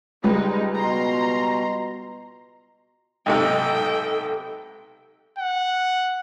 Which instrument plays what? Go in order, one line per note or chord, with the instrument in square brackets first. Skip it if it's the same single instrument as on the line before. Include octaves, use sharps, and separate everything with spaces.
[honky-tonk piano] C#2 G3 B4 [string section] G#3 D#4
[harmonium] B2 [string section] A#5 C6
[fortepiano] B1 G#2 C3 [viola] A4 G5
[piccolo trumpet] F#5